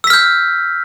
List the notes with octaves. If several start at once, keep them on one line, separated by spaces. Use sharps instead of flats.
E6 F6 G6 B6